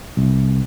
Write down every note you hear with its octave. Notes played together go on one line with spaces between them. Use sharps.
C2